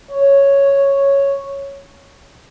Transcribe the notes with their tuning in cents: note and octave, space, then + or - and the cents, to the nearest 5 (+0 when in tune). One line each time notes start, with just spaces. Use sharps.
C#5 +0